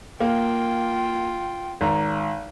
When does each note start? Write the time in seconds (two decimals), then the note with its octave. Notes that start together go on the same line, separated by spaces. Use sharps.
0.20 A#3 F4 G5
1.81 G#1 A#5